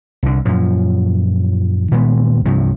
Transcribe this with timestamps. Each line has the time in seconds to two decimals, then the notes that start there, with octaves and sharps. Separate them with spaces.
0.23 C2 D3
0.45 F#2 A#2 F3
1.92 A#2 D#3 G#3 B3
2.45 C2 G2 C3 F3